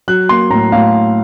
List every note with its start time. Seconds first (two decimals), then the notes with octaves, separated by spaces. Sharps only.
0.08 F#3 F#6
0.29 A#3 C6
0.50 A2 A#5
0.72 A2 F5